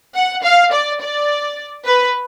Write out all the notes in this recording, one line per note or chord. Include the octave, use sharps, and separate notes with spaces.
F#5
F5
D5
D5
B4